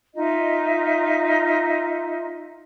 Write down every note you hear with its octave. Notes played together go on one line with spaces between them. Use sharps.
D#4 F4 D#5 E5